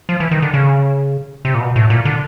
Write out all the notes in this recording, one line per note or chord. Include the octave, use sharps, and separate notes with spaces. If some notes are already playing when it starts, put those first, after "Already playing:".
F3
E3
D#3
D3
C#3
C3
A#2
B2
A2
A#2
D3